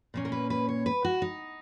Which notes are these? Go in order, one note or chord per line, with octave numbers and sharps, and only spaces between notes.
A#2 A#3 C#4
A#4
B4
B4
C#5
B4
F#4
D#4